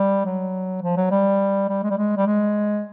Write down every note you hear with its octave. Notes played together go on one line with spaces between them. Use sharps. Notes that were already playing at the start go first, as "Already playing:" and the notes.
Already playing: G3
F#3
F3
F#3
G3
G3
G#3
G3
G#3
G3
G#3